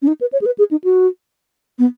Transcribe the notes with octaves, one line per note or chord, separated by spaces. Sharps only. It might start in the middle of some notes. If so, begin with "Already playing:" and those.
C#4
D#4
B4
C#5
G#4
B4
G#4
D#4
F#4
B3